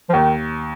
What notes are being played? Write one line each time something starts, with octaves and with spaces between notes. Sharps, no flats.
F3
D#2 D#3